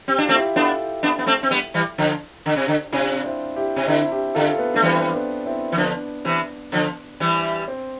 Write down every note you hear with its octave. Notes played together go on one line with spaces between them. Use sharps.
C4 G4
D4 F4
A3 C4
E4 G4
B3 D4 F4 A4
B3 D4
B3
A3 C4
C4
G3 B3
E3 G3
D3 F3
D3
C3
D3
C3 D4 F4
C4 E4
E4 G4
C3
D3 C4 E4
E4 G4
D3 F4 A4
B3
A3 D4
E3 G3 C4
B3 D4
C4 E4
E3
D3 F3 B3 D4
C3 E3
D3 F3
E3 G3
C4